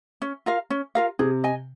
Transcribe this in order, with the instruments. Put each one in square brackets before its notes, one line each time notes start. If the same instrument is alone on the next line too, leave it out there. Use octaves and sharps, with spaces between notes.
[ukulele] C#4
F4 A#4 F5
C#4
F4 A#4 F5
[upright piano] C3 [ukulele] G#4
[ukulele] D#5 G#5